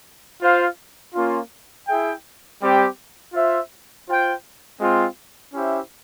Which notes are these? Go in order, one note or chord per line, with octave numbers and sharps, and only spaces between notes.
F4 C5 F5
A#3 C#4 F4
E4 G#4 E5 G5
G3 C4 G4
F4 C5 E5
F4 C5 G5
G#3 C4 F4
C#4 E4 G4 C5 E5